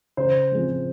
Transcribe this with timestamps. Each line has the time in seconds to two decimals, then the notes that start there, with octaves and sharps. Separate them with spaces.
0.17 C#3 C5
0.51 F3 G#3 C4